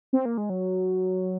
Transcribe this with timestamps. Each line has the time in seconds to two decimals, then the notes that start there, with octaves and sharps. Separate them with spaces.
0.13 C4
0.25 A#3
0.38 G#3
0.50 F#3